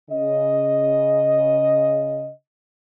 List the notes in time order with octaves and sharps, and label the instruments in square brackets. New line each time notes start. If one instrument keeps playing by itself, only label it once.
[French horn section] C#3 D#5